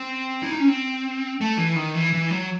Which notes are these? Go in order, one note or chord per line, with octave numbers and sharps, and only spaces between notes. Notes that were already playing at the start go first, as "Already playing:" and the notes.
Already playing: C4
E4
D#4
C#4
C4
A3
E3
D#3
E3
E3
F#3